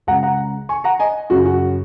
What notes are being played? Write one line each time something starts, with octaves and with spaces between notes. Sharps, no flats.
C#2 C#3 F#5 A#5
F#5 A#5
G#5 C#6
F#5 A#5
D#5 G#5
F#2 C#3 F#4
F#4